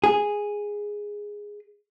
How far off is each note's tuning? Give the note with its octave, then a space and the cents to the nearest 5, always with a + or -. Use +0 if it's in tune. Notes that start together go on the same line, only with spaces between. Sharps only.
G#4 -5